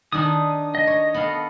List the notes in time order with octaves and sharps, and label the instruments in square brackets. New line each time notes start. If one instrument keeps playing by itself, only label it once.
[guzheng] D#3 D4 D#4 [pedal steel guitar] D#6
[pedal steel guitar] D#5
[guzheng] C#5
B3 A4 F5